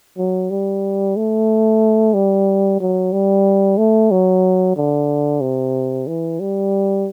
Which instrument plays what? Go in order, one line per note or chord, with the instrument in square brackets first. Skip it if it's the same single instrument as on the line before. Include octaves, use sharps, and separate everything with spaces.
[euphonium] F#3
G3
A3
G3
F#3
G3
A3
F#3
D3
C3
E3
G3